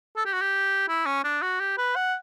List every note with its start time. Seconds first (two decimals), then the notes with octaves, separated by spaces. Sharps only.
0.16 A4
0.25 G4
0.33 F#4
0.41 G4
0.88 E4
1.06 C#4
1.24 D4
1.42 F#4
1.60 G4
1.78 B4
1.96 F#5